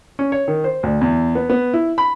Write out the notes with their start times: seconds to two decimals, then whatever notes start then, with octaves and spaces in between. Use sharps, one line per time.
0.19 C#4
0.32 C#5
0.48 D#3
0.64 C5
0.83 D2
1.01 E2
1.35 B3
1.50 B3
1.74 E4
1.98 B5